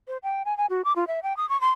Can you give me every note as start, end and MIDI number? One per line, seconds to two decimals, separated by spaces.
0.08 0.17 72
0.23 0.43 79
0.45 0.56 80
0.58 0.66 80
0.70 0.82 66
0.85 0.93 86
0.96 1.07 65
1.07 1.20 76
1.23 1.36 79
1.37 1.48 87
1.49 1.59 85
1.61 1.72 84